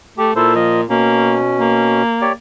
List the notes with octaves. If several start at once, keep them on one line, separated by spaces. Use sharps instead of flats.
A3 G4
A#2 E4 A4 C5
F3 D#5
B2 A#3 C#4
A#3
G4 C#5 D5